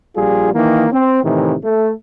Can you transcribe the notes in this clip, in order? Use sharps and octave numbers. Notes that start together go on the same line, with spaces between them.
A#1 G3 F4 G#4
D#3 E3 A#3
C4
A2 C3 D#3 E3
A3